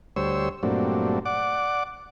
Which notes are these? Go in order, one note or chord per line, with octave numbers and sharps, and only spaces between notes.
D2 G3 C5 C#5 E6
G2 A#2 F#3 A3 C4 D4
D5 F#5 D6